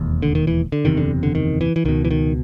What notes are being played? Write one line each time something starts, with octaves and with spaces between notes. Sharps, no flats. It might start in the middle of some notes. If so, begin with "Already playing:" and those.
Already playing: E1 D#2
D3
D#3
E3
D3
F#1 E2 C3 D#3
D3
D3
D#3
E3
E3
C#2 B2 D#3
E3
D#3